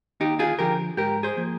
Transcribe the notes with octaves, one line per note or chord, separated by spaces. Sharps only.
D#2 D#4 G4
F4 G#4
D3 F3 G4 A#4
G#2 G4 A#4
G#4 C5
F3 A#3